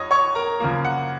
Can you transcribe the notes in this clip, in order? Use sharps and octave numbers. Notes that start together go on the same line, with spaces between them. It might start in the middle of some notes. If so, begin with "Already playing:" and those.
Already playing: F#2 C#5 D#5 D#6
C#5 C#6
A#4 A#5
F#2 C#3 F3 A#3
F#5